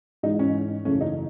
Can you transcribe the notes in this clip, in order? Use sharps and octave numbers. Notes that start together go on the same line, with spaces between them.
G#2 E3 G#3 D#4
C#4
F#2 C#3 E3 A3 C#4
D#4